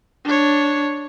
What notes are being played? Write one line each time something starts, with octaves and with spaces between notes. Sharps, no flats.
D4 C#5